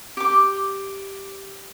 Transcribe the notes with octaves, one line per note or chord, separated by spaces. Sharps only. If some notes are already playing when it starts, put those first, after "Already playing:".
G4 D6